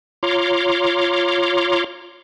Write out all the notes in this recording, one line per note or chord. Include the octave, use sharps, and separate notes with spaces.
F4 C#5 A#5 C6 D6